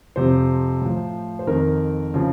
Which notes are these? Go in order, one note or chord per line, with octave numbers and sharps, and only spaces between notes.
F2 C3 F3 C5
A2 F3
C5
F2 D#3 A#4
C#3 F3